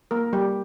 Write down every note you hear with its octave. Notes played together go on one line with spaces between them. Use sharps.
A#3 A#4
G3 G4